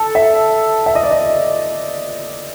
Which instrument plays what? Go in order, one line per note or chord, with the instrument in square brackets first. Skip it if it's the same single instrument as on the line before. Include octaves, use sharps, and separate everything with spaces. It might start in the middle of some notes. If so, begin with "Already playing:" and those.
Already playing: [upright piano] A4
E5
E5
D#5
D5
D#5